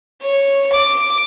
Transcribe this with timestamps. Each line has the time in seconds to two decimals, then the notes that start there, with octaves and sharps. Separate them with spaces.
0.22 C#5
0.72 D6